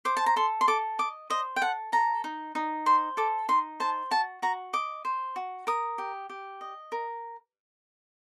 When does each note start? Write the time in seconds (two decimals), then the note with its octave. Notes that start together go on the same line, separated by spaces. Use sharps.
0.05 C5 D6
0.17 A5
0.26 A#5
0.36 A4 C6
0.61 C6
0.67 A4 D6
0.99 D#5 D6
1.30 C5 D#5
1.56 G5
1.61 A4 F#5
1.92 A4 A#5
2.24 D#4
2.55 D#4
2.86 C5 C6
3.17 A4 D6
3.48 D#4 C6
3.80 C5 A5
4.11 F#4 A5
4.42 F#4 A#5
4.73 D#5 D6
5.05 C5
5.36 F#4
5.67 A#4 D#6
5.98 G4
6.29 G4
6.61 D#5
6.92 A#4